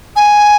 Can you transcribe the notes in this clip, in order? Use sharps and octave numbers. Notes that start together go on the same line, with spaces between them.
G#5